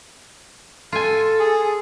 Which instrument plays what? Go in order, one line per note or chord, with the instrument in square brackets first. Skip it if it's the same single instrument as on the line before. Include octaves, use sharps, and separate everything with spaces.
[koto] F4 G#5 [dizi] A4
[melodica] G#4